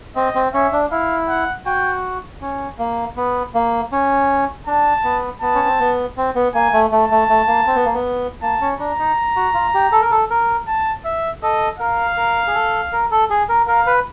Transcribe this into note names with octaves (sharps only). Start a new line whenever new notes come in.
C4 D#5
C4
C#4 E5
D4
E4 F5
F#5
F#4 G5
C#4
A#3
B3
A#3
C#4
D4 A5
B3
B3 A5
C#4
C4
B3
C4
B3
A#3 G#5
A3
A3 A5
A3
A3
A#3
C4
B3
A#3
B3
A#3 A5
C#4
D4 A#5
D#4
F#4
F4
G4
A4
A#4
A4
A#4
A5
E5
A4 D#5
A#4 F5
A#4
G#4
A4
A#4
A4
G#4
A#4
A#4 F5
B4